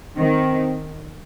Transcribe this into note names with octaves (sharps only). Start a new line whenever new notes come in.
D#3 C4